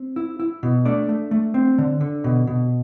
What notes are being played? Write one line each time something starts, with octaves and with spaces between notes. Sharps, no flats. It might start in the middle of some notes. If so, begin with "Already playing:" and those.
Already playing: C4
E4
E4
B2
A3 D4 D5
A3
A3
C4
D3
D3
B2
B2